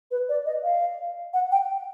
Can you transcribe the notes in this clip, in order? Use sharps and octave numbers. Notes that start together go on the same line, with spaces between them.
B4
D5
D#5
F5
F#5
G5